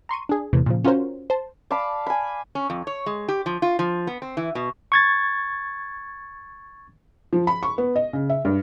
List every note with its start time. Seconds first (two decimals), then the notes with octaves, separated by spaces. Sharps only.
0.09 A#5 C6 C#6 D#7
0.29 D4 G#4
0.53 E2 A2 C3 E3
0.66 A#2 C#3 F3
0.84 C#4 F4 F#4 A#4 C5 C#5
1.30 C5 A5
1.71 D5 F5 A5 B5
2.06 G#5 B5
2.55 C#4
2.70 F2
2.87 C#5
3.06 G#3
3.28 G4
3.46 F3
3.62 F4
3.79 F3
4.07 B3
4.22 C4
4.37 E3
4.55 B2
4.92 C#6 G#6 A6
7.33 F3
7.47 B5
7.63 C#6
7.78 B3
7.96 D#5
8.13 C#3
8.30 E5
8.45 G2